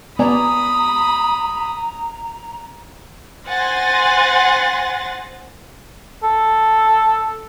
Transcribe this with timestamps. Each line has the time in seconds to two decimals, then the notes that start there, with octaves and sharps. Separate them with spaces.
0.19 B3 D5 G#5 A#5 B5 D#6
3.49 C5 F#5 G#5 C6 A6 A#6
6.24 A4